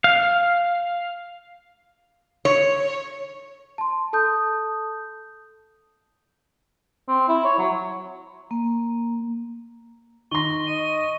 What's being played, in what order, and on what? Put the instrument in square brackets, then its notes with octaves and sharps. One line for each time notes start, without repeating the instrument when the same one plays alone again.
[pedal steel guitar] F5
[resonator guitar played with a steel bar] C#5
[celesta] A5 C6
A4 A5 D#6 G6
[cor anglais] C4
E4
C#5
F#3
[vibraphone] A#3
[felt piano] D#3 C6 [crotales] C#6 A#6 [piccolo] G7
[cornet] D#5 [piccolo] D#7